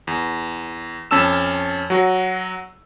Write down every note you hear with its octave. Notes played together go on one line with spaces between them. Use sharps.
E2
F2 C#4 A5 E6 E7
F#3 F#4